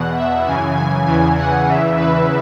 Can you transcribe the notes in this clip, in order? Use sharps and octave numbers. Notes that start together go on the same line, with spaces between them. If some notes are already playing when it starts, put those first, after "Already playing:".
Already playing: E2 B2 F#5
E5
F#2 C#3 E3 G#5
G#5
E2 C#3 E3 G#5
F#5
E2 C#3 E3 E5
B4